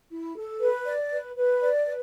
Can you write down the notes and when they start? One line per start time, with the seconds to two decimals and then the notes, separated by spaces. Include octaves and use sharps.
0.11 E4
0.37 A4
0.61 B4
0.86 D5
1.12 B4
1.37 B4
1.61 D5
1.86 B4